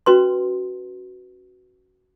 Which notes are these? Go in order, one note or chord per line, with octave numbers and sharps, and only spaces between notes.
C#4 F#4 B4 C6